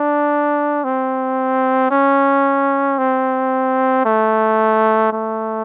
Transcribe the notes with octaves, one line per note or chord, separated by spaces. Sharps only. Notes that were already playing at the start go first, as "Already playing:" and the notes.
Already playing: D4
C4
C#4
C4
A3
A3